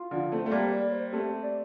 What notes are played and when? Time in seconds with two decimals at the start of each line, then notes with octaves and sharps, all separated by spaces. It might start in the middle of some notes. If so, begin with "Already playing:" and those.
Already playing: F4
0.11 D3 F3
0.32 A3 C4
0.46 A3 F4
0.51 G3 A#3 G4
0.72 D5
0.92 C5
1.12 A3 C4 G4
1.42 D5